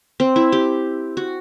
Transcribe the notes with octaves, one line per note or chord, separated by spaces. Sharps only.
C4
E4
G4
F#4